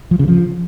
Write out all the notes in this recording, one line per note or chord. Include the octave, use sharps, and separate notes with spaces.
F3
C#3
F3